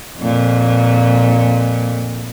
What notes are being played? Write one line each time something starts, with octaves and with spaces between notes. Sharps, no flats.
F2 A#2